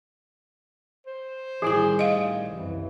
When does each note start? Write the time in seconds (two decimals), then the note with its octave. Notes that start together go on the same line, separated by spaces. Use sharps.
1.06 C5
1.62 A1 D#3 E3 G3 E4 G#4 G#5
1.99 D#5 F5
2.49 C2 F#2 E3